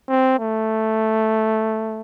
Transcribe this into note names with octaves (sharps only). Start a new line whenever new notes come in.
C4
A3